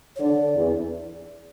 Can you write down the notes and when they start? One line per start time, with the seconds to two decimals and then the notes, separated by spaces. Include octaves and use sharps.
0.16 C#5
0.20 D3 D5
0.55 E2